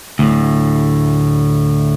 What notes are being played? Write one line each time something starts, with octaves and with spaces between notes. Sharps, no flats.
D2 A2